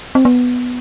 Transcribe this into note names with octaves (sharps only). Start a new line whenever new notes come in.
C4
B3